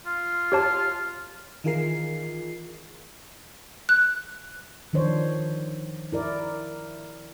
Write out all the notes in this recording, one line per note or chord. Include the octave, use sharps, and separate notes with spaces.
F4
G4 C#5 A5
D#3 E3 F4 G#4 A#4 C7
F#6
D#3 F3 D4 C5 C#5
E4 A#4 D5